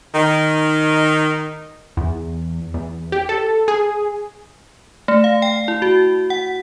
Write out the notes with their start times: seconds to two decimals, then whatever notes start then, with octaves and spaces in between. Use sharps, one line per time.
0.14 D#3
1.97 E2
2.74 E2
3.12 G4
3.29 A4
3.68 G#4
5.08 A3
5.24 F5
5.42 G5
5.68 E4
5.82 F#4
6.30 F#5